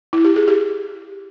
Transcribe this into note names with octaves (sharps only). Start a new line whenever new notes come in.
E4
G4
G#4
G4